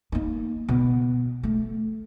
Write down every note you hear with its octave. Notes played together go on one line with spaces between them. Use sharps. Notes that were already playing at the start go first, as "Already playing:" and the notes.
A#3 D#4
B2
A3